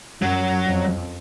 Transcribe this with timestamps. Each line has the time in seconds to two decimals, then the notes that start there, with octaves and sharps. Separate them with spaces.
0.22 F#2 F#3
0.67 F2